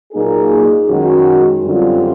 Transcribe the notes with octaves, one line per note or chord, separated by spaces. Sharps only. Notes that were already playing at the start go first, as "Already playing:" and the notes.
A#2 F#3 A#3 D#4 G#4
F#2 D#3 G#3 C#4 F#4
F#2 D3 G3 C4 F4